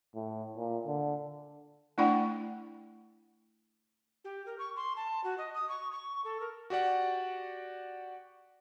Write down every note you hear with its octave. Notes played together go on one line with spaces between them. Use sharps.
A2
A#2
D3
A3 D4 E4 D5 F#5 G5
G4
A#4
C#6
C6
A5
F#4
D#5
D#6
C#6
C#6
A4
A#4
F#4 G4 D5 F#5